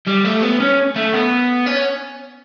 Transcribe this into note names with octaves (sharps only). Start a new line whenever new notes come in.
G3
A3
B3
C#4
A3
B3
C#4